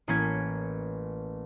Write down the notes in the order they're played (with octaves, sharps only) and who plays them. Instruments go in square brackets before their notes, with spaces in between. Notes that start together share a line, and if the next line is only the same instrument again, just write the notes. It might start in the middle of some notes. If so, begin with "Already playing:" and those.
[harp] A1 A#3 C#4 G#6 B6